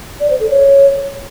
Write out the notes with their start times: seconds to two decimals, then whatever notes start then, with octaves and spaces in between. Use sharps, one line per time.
0.20 D5
0.30 C5
0.40 A4
0.50 C#5